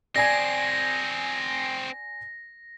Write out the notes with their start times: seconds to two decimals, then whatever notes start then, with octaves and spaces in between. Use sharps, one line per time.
0.16 C4 G#4 D5 G#5 G#6 A#6